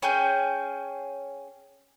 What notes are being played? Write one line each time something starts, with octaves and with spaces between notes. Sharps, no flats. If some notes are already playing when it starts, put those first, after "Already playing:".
C#4 G#4 G5 G6